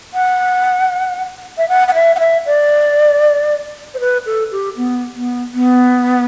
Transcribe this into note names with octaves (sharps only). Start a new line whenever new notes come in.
F#5
E5
F#5
F#5
E5
F#5
E5
D5
C5
B4
A4
G4
B3
B3
B3